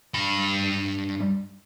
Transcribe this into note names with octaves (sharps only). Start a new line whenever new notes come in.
G2 B5